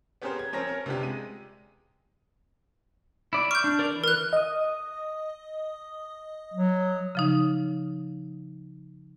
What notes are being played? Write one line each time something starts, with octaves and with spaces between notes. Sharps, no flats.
B3 C#4 G4 G#4 A#4 C5
G#6
F3 C4 C#4 A#4 C#5 A#6
C#4 A#4
C3 B3 D4 F4 G4
G#3 D#7
E4 D5
C#6 F6 G6
D4
A#4 D5
E3
A#4 F#6
D#5 D#6
F#3
C#3 F3 D#4